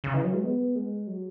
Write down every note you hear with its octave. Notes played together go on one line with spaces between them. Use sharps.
C#3
E3
F#3
G#3
B3
G#3
F#3